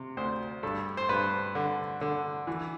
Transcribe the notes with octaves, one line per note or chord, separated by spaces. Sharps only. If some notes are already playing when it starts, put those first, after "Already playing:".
Already playing: C3
D2 C5
G2 A4
C5
G2 B4
D3
D3
E3